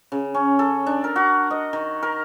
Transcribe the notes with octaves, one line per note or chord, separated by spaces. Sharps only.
C#3
C#4
A4
D4
A#4
F#4
D#5
D#3
A#4